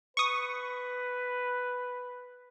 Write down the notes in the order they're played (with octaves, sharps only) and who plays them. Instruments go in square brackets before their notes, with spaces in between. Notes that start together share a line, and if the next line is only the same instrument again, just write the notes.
[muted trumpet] B4 [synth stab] C#6 D#6